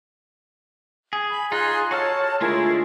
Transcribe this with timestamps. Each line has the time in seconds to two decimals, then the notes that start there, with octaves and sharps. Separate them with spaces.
1.13 G#4
1.30 B5
1.52 D#4 F4 G#4 C6 F#6
1.91 F#4 A4 C#5 A5 F6
2.41 D3 G#3 A3 E4 F4 G#4 A#4